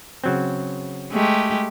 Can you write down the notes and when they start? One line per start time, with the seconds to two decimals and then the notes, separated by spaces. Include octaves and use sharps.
0.24 C#3 F#3 C4
1.12 G#3 A3 G4